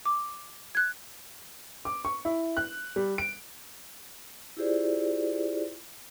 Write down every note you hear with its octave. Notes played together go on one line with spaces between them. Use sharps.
D6
F#6 G#6
D6
C#6
E4
F#6
G3
D7
E4 F4 G4 G#4 C5 D5